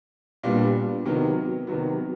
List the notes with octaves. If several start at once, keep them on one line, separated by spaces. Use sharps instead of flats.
A#2 G3 B3 D4
C3 D#3 F#3 B3
C3 D#3 F#3 B3